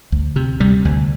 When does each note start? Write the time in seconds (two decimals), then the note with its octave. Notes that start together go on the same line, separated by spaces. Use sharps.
0.12 D2
0.36 C3
0.60 C3 G3
0.85 D2